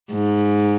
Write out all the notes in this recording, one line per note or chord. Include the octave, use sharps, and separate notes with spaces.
G#2